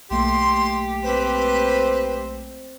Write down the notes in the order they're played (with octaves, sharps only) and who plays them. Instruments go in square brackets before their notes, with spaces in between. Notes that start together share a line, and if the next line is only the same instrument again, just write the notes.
[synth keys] B1 A3 A#3 [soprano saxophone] G4 [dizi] C6
[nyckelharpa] C4 C5 [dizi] B4